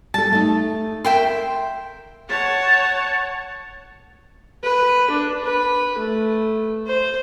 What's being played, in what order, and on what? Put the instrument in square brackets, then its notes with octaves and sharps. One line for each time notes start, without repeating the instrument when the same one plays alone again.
[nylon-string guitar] G3 A4 [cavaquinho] A5
[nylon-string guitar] A3 D#4
[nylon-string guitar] A#4 [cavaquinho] E5 G5 C6
[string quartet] C#5 F#5 A5
[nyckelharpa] B4
D4
B4
A3
C5